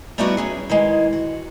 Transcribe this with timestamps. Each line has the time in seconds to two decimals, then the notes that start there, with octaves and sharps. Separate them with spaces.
0.18 G3 A3 B3 D#4 E4 F#4
0.37 F#3 C#4 G#4
0.69 D#3 E3 G#3
1.13 F#4